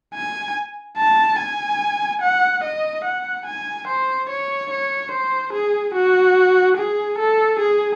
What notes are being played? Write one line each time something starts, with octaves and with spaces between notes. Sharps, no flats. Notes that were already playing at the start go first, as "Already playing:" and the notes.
G#5
A5
G#5
F#5
D#5
F#5
G#5
C5
C#5
C#5
C5
G#4
F#4
G#4
A4
G#4